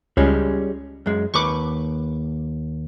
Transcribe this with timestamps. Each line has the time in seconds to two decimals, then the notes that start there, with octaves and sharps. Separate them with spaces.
0.17 C#2 G3 G#3 C#4
1.06 F#2 G#3
1.34 D#2 B4 C#6 D6